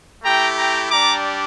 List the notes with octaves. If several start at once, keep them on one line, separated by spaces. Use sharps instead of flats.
A3 E4 G4 G5 A#5
G5 A#5
G3 D4 G4 A#5 D6